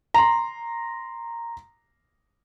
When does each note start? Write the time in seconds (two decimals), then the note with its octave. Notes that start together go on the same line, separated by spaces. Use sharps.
0.14 A#5 C6